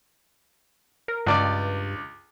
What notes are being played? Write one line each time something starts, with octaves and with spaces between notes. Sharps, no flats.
A#4
C#2 G2 D5 D6